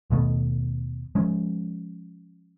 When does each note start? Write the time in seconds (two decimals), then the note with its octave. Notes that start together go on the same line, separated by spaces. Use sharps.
0.10 D#2 B2 A3 B3
1.15 F3 G#3 C#4